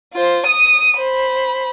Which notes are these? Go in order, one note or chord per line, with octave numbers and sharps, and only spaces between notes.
F4 C5
D#6 D#7
C5 B5